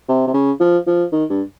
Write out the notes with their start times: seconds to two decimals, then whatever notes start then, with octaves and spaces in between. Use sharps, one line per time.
0.08 C3
0.27 C3
0.33 C#3
0.60 F3
0.86 F3
1.12 D#3
1.30 G2